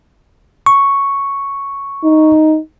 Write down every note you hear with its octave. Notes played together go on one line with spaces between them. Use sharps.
C#6
D#4